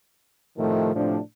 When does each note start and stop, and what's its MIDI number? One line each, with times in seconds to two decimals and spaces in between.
0.58 0.95 45
0.58 0.95 48
0.58 0.95 51
0.58 0.95 53
0.58 0.95 57
0.95 1.19 45
0.95 1.19 48
0.95 1.19 53
0.95 1.19 62